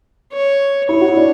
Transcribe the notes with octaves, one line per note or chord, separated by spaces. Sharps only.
C#5
E4 C#5
F#4
E4
D4